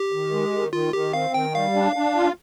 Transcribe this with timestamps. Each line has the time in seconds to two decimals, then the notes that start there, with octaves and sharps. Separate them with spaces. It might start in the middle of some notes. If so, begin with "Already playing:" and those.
Already playing: G4
0.12 D#3
0.32 G#3
0.53 D#3
0.72 D#3 F4
0.93 D#3 G4
1.13 C4 F5
1.34 D#3 G5
1.55 G3 F5
1.76 D4
1.96 D4
2.16 F4